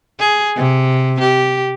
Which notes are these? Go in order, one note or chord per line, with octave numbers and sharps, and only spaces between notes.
G#4
C3
G4